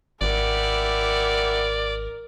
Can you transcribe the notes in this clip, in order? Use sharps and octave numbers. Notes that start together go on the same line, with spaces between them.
G#1 E4 G4 A#4 D5 F#5